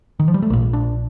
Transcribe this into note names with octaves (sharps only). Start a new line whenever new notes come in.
D#3
F3
G3
A3
A#1 A#2 A#3
D4